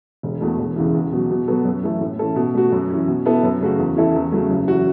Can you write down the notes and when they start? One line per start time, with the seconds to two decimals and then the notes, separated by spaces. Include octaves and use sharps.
0.23 E1
0.41 E2 B2 A3
0.58 E1
0.76 E2 C#3 E3
0.94 E2
1.12 B2 F#3
1.30 B2
1.48 F#3 B3 F#4 A4
1.65 F#2
1.83 E3 A3 E4 A4
2.01 A2
2.19 E3 C#4 A4
2.36 B2
2.54 A3 F#4
2.72 F#2
2.90 E3 C#4
3.08 B2
3.25 B3 E4 A4
3.43 F#2
3.61 C#3 A3 F#4
3.78 E2
3.97 E3 C#4 E4 A4
4.15 E2
4.32 C#3 F#3 A3
4.50 F#1
4.68 E3 C#4 F#4